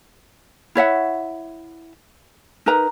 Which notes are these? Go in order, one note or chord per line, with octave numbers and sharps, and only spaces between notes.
E4 C#5 E5 F#5
D#4 A#4 B4 A#5